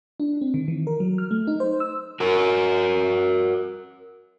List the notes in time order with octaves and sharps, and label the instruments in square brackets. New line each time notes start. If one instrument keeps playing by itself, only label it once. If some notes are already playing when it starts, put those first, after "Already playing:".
[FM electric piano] D4
C4
D#3
E3
A#4
F#3
F6
A3
D#4
C5
E6
[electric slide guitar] F#4 A#4